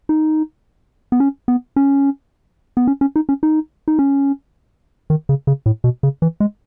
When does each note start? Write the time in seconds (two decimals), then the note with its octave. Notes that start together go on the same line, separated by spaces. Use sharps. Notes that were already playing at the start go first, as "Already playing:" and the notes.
0.09 D#4
1.12 B3
1.20 C#4
1.48 B3
1.76 C#4
2.77 B3
2.87 C#4
3.01 C#4
3.16 D#4
3.29 C#4
3.43 D#4
3.88 D#4
3.99 C#4
5.10 D#3
5.29 C#3
5.47 C#3
5.66 A2
5.84 B2
6.03 C#3
6.22 E3
6.40 G#3